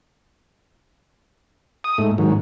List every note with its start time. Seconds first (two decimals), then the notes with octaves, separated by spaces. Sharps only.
1.84 D#6
1.98 G#2 A3
2.18 G#2 D#3 F#3